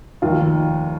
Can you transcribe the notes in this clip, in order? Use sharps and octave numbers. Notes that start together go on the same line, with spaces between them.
F1 D#2 D#3 F4